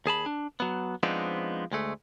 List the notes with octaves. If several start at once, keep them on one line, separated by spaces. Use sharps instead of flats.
D#2 G#4 A5 B5
D4
F#3 B3
F3 G#3 B3 C4 D4 D#4
D2 G#3 A3